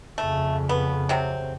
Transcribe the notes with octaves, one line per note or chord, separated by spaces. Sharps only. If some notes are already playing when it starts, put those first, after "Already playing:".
F2 C#3 A3
B3
C3 F#3 C4